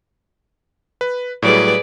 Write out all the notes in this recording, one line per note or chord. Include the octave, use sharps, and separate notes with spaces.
B4
A2 F#3 G3 G#4 B4 D5